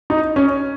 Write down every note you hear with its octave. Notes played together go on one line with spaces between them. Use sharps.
D#4
C#4